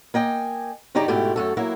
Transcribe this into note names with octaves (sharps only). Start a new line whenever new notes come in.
A#3 D#5 G5 G#5
G2 C#3 D#4 G4 D5 A#5
G#2 B2 A3 E4 G4
F#2 A3 A4
F#3 A#3 E4